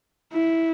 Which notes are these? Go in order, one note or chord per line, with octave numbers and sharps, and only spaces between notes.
E4